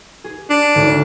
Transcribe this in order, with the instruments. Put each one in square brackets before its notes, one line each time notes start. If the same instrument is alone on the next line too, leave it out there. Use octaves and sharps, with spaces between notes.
[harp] G#4
[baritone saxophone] D4
[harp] G#1 D2 C#3